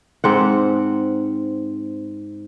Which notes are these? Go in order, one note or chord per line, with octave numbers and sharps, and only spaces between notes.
G#2 C4 F#5